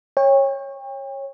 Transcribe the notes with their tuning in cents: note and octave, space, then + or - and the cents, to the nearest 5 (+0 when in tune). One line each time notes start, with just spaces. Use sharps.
C#5 -15 G5 +35